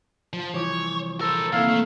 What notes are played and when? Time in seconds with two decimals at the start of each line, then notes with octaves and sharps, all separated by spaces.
0.33 F3
0.54 C2 E3 F3 C#5
1.21 A4 A#4 C5
1.53 D3 A#3 C4 E4 A4 F5
1.69 A3